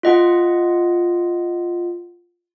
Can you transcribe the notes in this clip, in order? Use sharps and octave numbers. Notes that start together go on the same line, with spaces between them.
F4 D#5 F#5